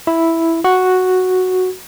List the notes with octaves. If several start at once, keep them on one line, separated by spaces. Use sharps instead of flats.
E4
F#4